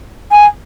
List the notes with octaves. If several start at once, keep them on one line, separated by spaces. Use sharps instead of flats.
G#5